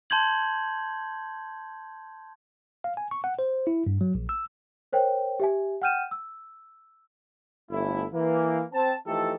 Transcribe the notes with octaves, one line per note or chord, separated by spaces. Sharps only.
A5 C6 G6 G#6 F#7
F5
G#5
C#6
F#5
C5
E4
G2
F#3
A#1
E6
A#4 C5 C#5 G5
G4 E5 G#5
F#5 G5 F6 G6 D#7 E7
E6
G1 A3 E4
E3 A#3
C4 A5
E3 F3 A3 D#4 G4 A4